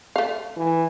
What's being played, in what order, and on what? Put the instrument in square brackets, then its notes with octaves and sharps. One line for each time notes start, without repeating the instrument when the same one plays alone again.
[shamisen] A3 F5
[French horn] E3